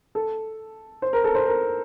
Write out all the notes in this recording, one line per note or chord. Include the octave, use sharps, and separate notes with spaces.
A4
C5
A#4
A4
C5
A#4